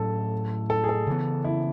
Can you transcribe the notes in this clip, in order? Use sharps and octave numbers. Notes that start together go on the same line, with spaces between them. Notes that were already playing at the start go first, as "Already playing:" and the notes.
Already playing: A2 F#3 C#4 A4
A4
G#4
A4
C#3 E3 B3
E4